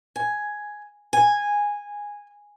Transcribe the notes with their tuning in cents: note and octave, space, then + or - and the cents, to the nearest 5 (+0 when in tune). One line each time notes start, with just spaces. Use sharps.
G#5 +5
G#5 -10